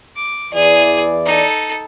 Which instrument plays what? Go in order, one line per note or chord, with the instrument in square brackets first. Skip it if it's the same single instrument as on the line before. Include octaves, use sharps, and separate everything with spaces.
[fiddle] D6
[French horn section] E2 E3 D5 [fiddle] G#4
[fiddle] D#4 A4